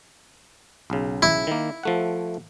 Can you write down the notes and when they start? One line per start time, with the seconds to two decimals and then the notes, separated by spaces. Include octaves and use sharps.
0.90 B1 C#3
1.22 E4
1.47 D#3 A#3
1.83 F3 A3 F#5